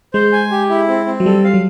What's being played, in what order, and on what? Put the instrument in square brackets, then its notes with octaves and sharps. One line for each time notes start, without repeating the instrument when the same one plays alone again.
[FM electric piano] G#3 [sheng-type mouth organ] C5
[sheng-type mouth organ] G#5
G4
E4
C4
C4
[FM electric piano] F#3
[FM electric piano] G3 [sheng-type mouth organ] A4
[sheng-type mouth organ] F5
[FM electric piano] F#3